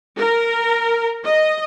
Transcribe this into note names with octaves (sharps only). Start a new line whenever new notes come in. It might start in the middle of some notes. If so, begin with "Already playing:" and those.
A#4
D#5